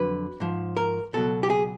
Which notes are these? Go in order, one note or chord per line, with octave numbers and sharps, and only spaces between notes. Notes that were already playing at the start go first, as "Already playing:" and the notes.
Already playing: F2 D3 F#3 B4
G#2 F3
A#4
C#2 B2 F#3 A4
G4
G#4